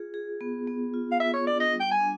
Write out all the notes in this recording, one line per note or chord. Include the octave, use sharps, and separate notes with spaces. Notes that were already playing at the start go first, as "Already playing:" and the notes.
Already playing: F4 G#4
G#4
B3
B3
F4
F5
F4 E5
C#5
D4 D5
D#5
G3
G5
G#5
D4